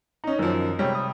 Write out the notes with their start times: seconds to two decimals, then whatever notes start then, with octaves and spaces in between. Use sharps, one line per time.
0.24 C#4 D#4 D#5 A#5
0.39 F#2 D#3 F3 F#3 C#4
0.79 C3 G3 G#3 C#5 G5
0.95 D#6